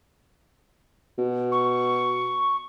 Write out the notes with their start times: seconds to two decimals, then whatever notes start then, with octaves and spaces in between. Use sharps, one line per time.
1.18 B2
1.52 C#6